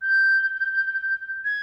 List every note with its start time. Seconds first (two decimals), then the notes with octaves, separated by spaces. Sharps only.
0.02 G6
1.45 G#6